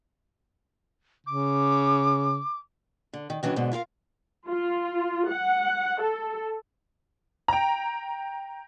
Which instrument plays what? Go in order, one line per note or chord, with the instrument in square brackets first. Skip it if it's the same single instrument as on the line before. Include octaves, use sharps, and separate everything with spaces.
[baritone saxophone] C#3 [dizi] D6
[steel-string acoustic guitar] D3
D#3
D#3 E3 F#3 C#4 D4
G#2 B2 D3
E4 F4 A#4 F5
[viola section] F4
F#5
A4
[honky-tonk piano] G5 A#5